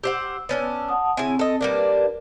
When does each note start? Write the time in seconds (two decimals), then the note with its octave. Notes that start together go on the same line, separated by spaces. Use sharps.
0.04 G4 C5 F#5 E6
0.49 B3 C#4 D4
0.89 F#5 A5 D#6
1.17 C#3 C4 E4 G#5
1.39 A4 D#5
1.61 G3 A#3 D4 A#4 B4